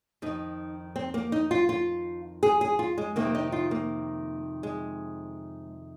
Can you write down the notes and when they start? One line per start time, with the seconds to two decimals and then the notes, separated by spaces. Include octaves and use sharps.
0.22 F2 D#3 D#4
0.96 C4
1.14 A#3
1.32 D#4
1.51 F4
1.69 F4
2.43 G#4
2.61 G#4
2.79 F4
2.98 G#3
3.16 F2 C3 D#3 A#3
3.35 D#4
3.52 F4
3.71 A#3
4.63 G#3